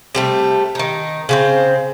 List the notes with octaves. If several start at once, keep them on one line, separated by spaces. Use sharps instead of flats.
C3 G3 A3
D#3 D#4
C#3 C4 C5